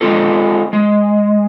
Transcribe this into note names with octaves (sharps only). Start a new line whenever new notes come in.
G#3 C4 F4 A4
G#3